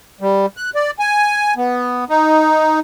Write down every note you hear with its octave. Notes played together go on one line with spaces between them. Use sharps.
G3
F#6
D5
G#5
B3
D#4